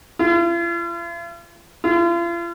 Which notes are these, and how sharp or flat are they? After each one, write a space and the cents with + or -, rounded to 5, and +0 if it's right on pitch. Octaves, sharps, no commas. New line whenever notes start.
F4 -45
F4 -40